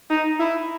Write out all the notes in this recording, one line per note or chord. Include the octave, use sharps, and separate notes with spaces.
D#4
E4